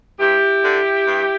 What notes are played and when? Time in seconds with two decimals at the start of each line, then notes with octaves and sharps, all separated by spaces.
0.20 G2 E4 G4
0.65 D3
1.07 G2